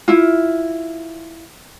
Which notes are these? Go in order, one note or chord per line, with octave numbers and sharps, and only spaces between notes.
E4 F4